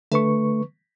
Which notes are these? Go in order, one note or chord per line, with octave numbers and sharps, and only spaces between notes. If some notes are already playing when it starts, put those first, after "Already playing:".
D3 A3 B4 C#6